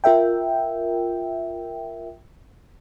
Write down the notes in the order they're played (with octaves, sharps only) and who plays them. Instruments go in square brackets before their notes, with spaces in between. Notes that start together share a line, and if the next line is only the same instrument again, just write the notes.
[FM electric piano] F4 A#4 E5 G5